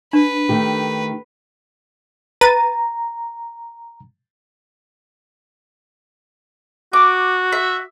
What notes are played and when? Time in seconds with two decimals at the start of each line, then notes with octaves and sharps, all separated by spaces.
0.13 D4 B4
0.49 D#3 A3 G4
2.41 B4 A#5 A6 D#7
6.93 F#4 D6
7.52 E5